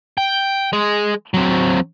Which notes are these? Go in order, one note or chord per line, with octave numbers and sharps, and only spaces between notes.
G5
G#3 D#5
F#3 C4